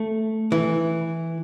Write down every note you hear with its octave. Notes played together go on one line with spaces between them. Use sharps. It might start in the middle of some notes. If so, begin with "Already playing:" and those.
Already playing: A3
E3